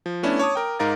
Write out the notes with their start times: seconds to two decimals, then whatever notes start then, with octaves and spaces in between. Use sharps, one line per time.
0.06 F3
0.23 A3 B3 C#4 D4 E4
0.39 C#5 A5 D6 D#6
0.55 A#4 G5
0.79 G#2 D#4 A#4 F5 A6